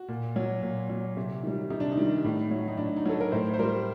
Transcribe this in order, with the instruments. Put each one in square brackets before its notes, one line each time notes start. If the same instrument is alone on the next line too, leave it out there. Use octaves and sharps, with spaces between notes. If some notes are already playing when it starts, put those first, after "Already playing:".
Already playing: [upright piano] F#4
A#2
F#3
A#2
F#3
C3
D#3 G3
C3 D#4
D4
D#4
D#3 G3
A2
F#3
D#4
A2 D4
D#4
F#3 A4
A#4
A2 C5
C5
G3 A#4